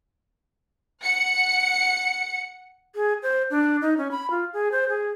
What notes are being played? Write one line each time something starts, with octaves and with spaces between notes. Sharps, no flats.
F#5 C#7
G#4
C5
D4
D#4
C#4
B5
F4
G#4
C5
G#4